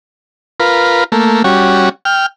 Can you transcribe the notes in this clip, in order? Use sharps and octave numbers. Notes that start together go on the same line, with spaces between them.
F4 A#4 B4
A3 A#3
G3 C#4 F#4
G5 F6